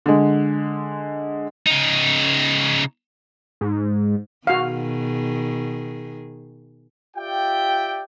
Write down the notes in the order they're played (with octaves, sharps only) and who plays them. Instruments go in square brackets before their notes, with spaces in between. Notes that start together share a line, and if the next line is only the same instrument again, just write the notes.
[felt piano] D3 G#3
[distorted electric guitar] C#3 D#4
[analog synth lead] G#2
[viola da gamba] B2 D#3 G#4 [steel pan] F#4 F5
[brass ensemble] F4 G4 D5 E5 G5